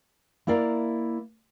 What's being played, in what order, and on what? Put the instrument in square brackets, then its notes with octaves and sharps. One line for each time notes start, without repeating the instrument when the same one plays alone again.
[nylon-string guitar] A#3 E4 A#4 D5 F5